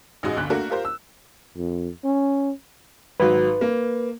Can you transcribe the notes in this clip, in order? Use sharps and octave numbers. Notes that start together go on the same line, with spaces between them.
A1 G#3 D#4 F#4 D#5
G1 D2 F#6
A3 A#3 D4 F#4 A#4
F4 G4 A#4 C5
E6
F2
C#4
G#1 F#3 B4
A#3